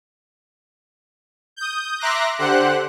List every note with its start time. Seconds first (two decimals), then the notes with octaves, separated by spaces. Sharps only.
1.56 D#6 G6
1.99 E5 A#5 C6 D6 F#6 A#6
2.39 D3 G4 C5 F#5 F#6